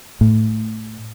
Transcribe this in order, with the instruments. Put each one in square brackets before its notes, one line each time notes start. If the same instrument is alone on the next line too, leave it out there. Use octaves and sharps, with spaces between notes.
[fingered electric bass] A2